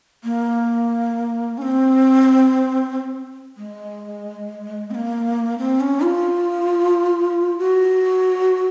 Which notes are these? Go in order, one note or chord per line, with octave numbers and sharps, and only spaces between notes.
A#3
C#4
C4
G#3
C4
A#3
C4
C#4
F4
F#4